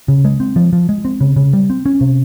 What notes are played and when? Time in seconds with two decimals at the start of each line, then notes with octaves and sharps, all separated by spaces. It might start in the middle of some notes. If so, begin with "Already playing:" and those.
0.08 C#3
0.25 G#3
0.40 C4
0.56 F3
0.73 F3
0.89 G#3
1.05 C4
1.21 C#3
1.36 C#3
1.53 G3
1.70 C4
1.86 C#4
2.01 C3